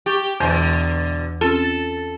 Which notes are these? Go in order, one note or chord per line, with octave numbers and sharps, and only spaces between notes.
G4 C#6 G6 A6
E2 B2 D3 E3 C5
C4 C#4 F4 A4